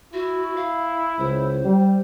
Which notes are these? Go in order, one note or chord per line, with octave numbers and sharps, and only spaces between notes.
E4 F#4
F5
C#2 C5
G3